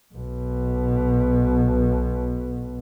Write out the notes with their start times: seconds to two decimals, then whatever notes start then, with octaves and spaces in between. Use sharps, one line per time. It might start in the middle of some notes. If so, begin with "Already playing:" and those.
0.15 B1 B2